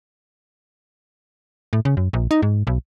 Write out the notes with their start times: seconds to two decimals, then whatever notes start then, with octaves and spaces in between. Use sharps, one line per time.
1.73 A2
1.85 C#3
1.97 F#2
2.13 A#1
2.31 D#4
2.42 G#2
2.67 B1